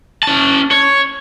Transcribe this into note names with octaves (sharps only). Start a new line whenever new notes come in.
C#4 A5
C#5